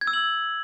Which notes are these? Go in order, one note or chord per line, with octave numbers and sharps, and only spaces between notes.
G#6
E6
F#7